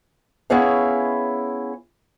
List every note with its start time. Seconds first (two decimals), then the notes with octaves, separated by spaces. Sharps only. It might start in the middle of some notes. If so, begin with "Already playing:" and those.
0.50 B3 C#4 E4 G#4 C#5 F5